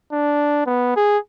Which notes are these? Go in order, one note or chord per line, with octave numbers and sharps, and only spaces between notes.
D4
B3
G#4